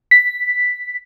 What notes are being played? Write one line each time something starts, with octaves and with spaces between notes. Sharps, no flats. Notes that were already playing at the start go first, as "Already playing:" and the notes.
B6